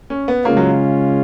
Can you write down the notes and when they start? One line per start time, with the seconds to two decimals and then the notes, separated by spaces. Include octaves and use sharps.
0.10 C#4
0.28 B3
0.44 C#3 G#3 A#3 C#4 F4
0.57 F#3